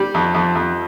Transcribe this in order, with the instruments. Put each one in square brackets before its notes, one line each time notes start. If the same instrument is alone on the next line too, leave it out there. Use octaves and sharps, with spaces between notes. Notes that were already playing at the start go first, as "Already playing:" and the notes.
Already playing: [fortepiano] G3
F2
F2
F2